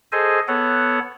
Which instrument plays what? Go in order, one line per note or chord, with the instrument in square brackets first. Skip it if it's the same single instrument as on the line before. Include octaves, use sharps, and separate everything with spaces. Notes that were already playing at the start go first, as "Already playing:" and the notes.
[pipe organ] G#4 A4 C5 D#5 G#5
B3 A4 C#5 F#5